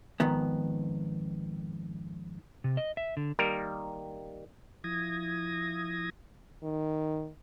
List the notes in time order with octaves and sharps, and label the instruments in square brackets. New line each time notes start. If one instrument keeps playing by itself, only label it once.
[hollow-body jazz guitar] F2 G#2 D#3 B3
[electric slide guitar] C3
D#5
E5
D3
[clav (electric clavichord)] D#3 G3 A#3 A#4
[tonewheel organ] F3 E4 D#6 G#6 A#6
[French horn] D#3